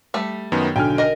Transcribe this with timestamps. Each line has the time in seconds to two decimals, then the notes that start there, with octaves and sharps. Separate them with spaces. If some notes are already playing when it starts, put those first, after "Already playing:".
0.14 G3 A3
0.52 F#2 D#3 B3
0.76 B1 D3 G5 G#5 F6
0.98 A#4 D#5